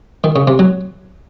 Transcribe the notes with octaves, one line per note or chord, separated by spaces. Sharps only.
D#3
C#3
C3
F#3